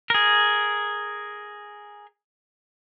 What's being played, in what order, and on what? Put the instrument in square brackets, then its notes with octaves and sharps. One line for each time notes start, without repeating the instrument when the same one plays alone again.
[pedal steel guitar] G#4 A#4